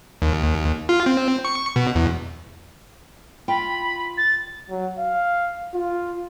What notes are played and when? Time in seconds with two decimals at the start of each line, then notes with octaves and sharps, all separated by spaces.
0.22 D#2
0.89 F4
1.06 C4
1.45 C#6
1.76 B2
1.95 E2
3.48 F4 G5 B5
4.17 A6
4.69 F#3
4.98 F5
5.74 F4